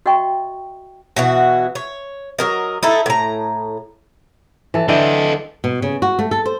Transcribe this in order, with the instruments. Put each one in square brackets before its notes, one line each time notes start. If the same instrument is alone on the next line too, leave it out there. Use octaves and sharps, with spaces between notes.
[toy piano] F#4 D#5 E5 G5 C#6
[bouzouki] B2 E3 F#4
C#5
F#3 A#4 D#5
D#4 E4 A4
A2 A#5
[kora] E3 A4
[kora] D3 E3 G5 [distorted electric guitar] A4 D#5
[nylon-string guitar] B2
C#3
F#4
A3
A4
C5